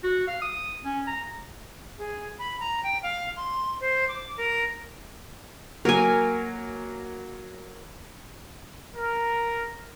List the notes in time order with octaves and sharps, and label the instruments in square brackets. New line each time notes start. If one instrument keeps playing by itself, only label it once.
[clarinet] F#4
F5
D#6
C#4
A#5
[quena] G#4
B5
A#5
G5
F5
C6
C5
D6
A#4
[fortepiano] F#3 A#3 [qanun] A#4 G#5
[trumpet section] A#4